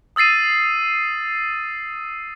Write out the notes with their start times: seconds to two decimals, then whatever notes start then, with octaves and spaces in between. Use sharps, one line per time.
0.16 D#6 E6 A6 C7 D#7